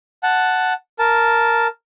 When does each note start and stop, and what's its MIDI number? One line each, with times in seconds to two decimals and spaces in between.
0.23 0.73 78
0.23 0.73 81
0.99 1.67 70
0.99 1.67 81